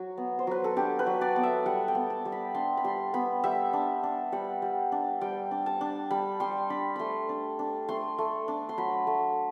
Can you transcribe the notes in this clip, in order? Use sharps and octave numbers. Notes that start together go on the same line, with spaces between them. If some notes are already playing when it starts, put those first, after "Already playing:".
Already playing: F#3 F#4
B3
C5
F#3 B4
A4
D4 G4
B4
F#3
D5
B3
E5
G3 F#5
G5
B3
A5
G3
B5
D4 C6
B5
G3 C6
B3 B5
G3 E5
D4
D4
G3 F#5
G3
D4
G3 G5
D4
A5
D4
G3 B5
G3 C6
D4 B5
A3 B5 C6
D4
D4
A3 C6
A3
D4
C6
F#3 B5
A3